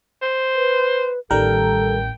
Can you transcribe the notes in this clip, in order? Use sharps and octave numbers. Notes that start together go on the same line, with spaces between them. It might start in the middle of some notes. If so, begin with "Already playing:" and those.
C5
B4
A1 D#3 G3 A4 A#4 G5